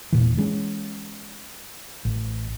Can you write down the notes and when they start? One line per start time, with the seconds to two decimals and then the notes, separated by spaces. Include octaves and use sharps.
0.12 E1 A#2 E3
0.37 E3 G#3 B3 C#4
2.05 A1